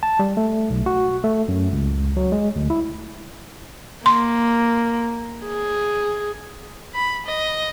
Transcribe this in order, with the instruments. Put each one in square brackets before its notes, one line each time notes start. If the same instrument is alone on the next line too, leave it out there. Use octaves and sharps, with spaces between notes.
[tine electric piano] A5
G3
A3
B1
F#4
A3
F#2
C#2
F#3
G#3
D2
E4
[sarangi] A#3 [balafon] C6
[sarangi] G#4
[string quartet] B5
D#5